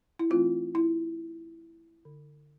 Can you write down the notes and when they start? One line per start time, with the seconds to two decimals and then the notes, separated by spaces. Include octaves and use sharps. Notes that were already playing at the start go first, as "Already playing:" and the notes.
0.19 E4
0.30 E3 A3 C4 F4
0.75 E4
2.05 D3